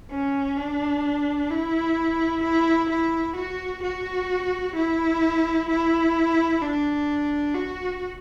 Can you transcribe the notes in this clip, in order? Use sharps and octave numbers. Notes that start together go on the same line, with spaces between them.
C#4
D4
E4
E4
E4
F#4
F#4
E4
E4
D4
F#4